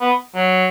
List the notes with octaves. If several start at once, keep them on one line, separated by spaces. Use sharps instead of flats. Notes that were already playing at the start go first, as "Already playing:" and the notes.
B3
F#3